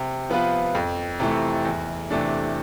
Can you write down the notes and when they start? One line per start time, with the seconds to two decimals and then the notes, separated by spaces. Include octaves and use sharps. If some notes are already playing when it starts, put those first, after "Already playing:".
Already playing: C3
0.30 F3 B3 F4 B4
0.75 F2
1.20 C3 E3 A3
1.65 E2
2.11 C3 E3 A3 D4